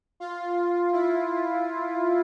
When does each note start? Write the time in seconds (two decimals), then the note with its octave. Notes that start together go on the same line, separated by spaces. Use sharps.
0.20 F4
0.93 E4